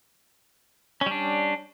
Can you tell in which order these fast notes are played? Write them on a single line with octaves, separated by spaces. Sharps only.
C#4 G3 D4